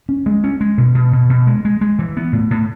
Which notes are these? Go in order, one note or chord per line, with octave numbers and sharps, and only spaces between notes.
C#4
G#3
C#4
G#3
B2
B2
B2
B2
G#3
G#3
G#3
E3
B3
A2
A2